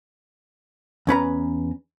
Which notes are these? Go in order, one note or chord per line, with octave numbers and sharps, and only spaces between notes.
E2 C#4 B4 A#5